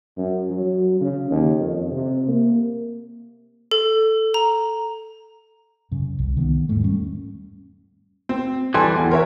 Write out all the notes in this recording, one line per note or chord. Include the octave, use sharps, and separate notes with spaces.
F#2
F#3
C#3
D#2
F2
C3
A#3
A4
A#5
F#2 C#3
C2
D#3 A3 B3
E2 G#2 E3 A3
G3 C#4
C4
E3 G3 A4 G#5 C6
E2
A#4 C#5 E5